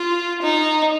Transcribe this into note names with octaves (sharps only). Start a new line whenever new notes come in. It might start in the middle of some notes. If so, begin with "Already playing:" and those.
Already playing: F4
D#4